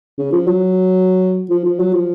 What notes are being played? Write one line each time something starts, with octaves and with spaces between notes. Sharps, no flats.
C#3
F3
F#3
F3
F3
F#3
F3